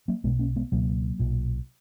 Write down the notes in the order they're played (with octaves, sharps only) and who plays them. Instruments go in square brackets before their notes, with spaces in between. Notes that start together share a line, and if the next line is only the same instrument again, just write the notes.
[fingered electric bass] F#3 A#3
B1 B2 G#3 B3
A#3 C#4
G#3 B3
C#2 B2 F#3 A#3
B1 A#2